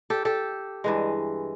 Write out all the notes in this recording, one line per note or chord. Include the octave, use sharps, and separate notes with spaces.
G4 A4
G4 A4
G2 E3 G#3